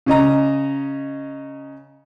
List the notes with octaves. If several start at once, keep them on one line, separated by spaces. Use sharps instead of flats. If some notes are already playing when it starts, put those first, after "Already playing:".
C#3 C#4 D#5 A#5